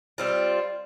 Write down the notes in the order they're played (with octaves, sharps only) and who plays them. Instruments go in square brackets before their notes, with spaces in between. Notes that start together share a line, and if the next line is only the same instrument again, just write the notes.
[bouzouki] G3 C4 F4